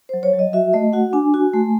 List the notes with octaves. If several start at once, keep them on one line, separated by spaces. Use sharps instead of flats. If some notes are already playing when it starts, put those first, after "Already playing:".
F#3 C5
C#5
F#3
D#5
F#4 E5
A3 D#5
F#4 F#5
D4 G#5
F#4
A3